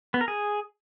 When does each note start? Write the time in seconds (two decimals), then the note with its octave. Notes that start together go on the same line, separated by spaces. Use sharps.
0.14 B3
0.21 A#4
0.28 G#4